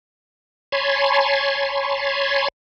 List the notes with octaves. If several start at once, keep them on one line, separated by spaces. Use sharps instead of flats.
C#5 G#5 A5 B5 C6